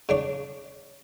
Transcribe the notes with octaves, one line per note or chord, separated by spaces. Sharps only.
C#3 D4 C#5